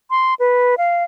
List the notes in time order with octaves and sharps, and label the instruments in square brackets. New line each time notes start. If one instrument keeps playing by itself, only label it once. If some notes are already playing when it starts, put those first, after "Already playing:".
[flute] C6
B4
F5